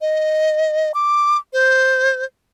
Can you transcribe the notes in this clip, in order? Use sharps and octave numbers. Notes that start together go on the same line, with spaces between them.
D#5
D6
C5